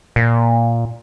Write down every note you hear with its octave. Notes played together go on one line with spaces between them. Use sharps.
A#2